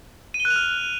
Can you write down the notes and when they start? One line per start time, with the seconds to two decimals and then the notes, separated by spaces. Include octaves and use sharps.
0.34 D#7
0.40 G7
0.45 F#6
0.50 F7
0.56 F6